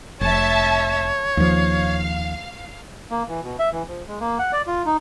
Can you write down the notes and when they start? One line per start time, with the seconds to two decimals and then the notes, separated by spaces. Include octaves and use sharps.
0.21 F1 C#5 E5 A5
1.37 D#2 F3 F5
3.11 A#3
3.28 E3
3.43 B2
3.59 E5
3.72 E3
3.88 F3
4.08 G#3
4.20 A#3
4.39 F#5
4.52 D5
4.67 F4
4.86 D#4